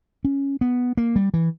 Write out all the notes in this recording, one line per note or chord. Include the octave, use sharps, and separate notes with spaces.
C#4
B3
A#3
G3
E3